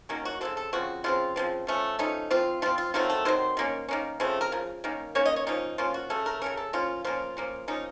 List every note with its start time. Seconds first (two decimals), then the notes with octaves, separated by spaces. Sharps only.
0.09 D#3 F#3 A#3 C#4
0.25 F#4
0.41 C#3 F3 C4 A4
0.57 A4
0.73 C#3 F3 C4 F#4
1.04 C#3 F3 C4 F4
1.36 C#3 F3 C4
1.67 F3 A3 C#4
1.99 F3 A3 C#4 D#4
2.30 F3 C4 F4
2.62 F3 C4 F4
2.78 F4
2.94 D#3 F#3 A3 C4 F4
3.10 A4
3.25 D#3 F#3 C4 C5
3.57 D#3 A#3 C#4
3.89 D#3 A#3 C#4
4.20 C#3 F3 A3 C4
4.41 A#4
4.52 C#3 F3
4.84 D#3 A#3 C#4
5.15 D#3 A#3 C#4 C#5
5.25 D#5
5.36 C#5
5.47 F3 A#3 C#4 D#4
5.78 F3 A#3 C#4 F4
5.94 F#4
6.10 C#3 A3 C#4 A4
6.26 A#4
6.42 C#3 A3 C#4 A#4
6.57 A4
6.73 F3 A#3 C#4 F4
7.05 F3 A#3 C#4 F4
7.37 F3 A#3 C#4
7.68 F3 A#3 C#4 D#4